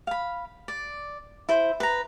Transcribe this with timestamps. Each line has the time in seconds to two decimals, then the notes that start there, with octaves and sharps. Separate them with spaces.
0.07 F5 B5
0.68 D5
1.49 E4 C5
1.80 B4 A#5